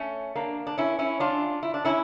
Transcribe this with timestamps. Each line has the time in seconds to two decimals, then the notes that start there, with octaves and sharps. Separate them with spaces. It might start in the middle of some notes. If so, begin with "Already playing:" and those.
Already playing: A3 C#4
0.35 A#3 D4
0.67 D4
0.78 C#4 E4
0.99 C#4 E4
1.20 D4 F4
1.63 E4
1.74 D4
1.85 C#4 E4